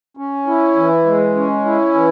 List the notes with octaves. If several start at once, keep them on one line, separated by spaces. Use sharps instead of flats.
C#4
E4
E3
G#3
C#4
E4
E3